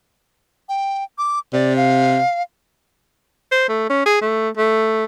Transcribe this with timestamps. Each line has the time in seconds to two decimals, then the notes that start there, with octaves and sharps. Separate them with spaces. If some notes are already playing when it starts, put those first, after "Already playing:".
0.69 G5
1.18 D6
1.53 C3 D5
1.76 F5
3.52 C5
3.69 A3
3.90 C#4
4.06 G#4
4.21 A3
4.57 A3